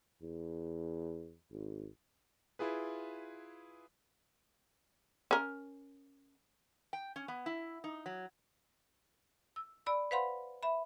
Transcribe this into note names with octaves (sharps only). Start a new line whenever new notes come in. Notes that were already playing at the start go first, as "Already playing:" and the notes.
E2
G#1
E4 F4 G#4 B4
C#4 A#4
G5
C#4
B3
E4
D#4
F#3
E6
D5 B5 E6
B4 C5 F5 F#5 B5 C6
E5 B5